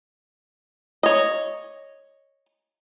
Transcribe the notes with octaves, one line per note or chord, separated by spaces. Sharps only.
C#5 D#5